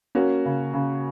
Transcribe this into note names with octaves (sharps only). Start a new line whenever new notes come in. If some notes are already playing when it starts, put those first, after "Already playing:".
A#3 C#4 F#4
C#3
C#3